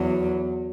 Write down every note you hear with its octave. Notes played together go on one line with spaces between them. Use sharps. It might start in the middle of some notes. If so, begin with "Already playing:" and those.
Already playing: E2 F#3